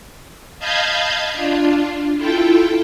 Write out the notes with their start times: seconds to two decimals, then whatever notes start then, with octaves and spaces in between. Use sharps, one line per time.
0.59 D#5 F5 A5 B5 G6 G#6
1.33 D4 F4
2.17 E4 F4 A4 G5